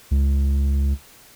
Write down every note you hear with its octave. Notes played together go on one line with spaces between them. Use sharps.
C#2